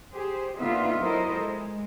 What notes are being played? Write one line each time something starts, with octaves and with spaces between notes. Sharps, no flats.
G4 G#4 C5
D3 A#3 B3 D#4 F4 E5
F#3 E4 A4 A#4 C5 D#5
G#3